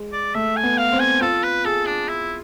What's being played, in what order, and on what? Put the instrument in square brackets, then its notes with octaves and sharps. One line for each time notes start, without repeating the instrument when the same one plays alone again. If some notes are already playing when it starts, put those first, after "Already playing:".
Already playing: [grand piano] G#3
[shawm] D5
[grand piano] A3 [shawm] E5
[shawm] G#5
[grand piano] B3
[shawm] F5
[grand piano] C4
[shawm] G#5
[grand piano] F4 [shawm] A4
[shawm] B4
[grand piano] G#4 [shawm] A4
[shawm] D4
E4